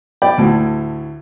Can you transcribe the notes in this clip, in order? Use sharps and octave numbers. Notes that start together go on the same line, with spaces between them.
D5 G5 B5
D2 A2